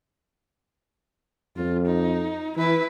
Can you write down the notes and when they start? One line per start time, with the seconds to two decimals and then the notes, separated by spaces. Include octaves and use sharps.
1.56 F2 F4
1.86 D#4
2.57 E3 E4 B4